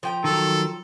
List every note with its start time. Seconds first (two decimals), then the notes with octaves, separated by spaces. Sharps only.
0.03 F3 G5 A#5
0.24 D#3 F#3 A4